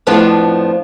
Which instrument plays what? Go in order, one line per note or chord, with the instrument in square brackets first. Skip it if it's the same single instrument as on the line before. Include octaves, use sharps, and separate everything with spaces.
[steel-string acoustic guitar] F2 A2 F3 B3 D4 F4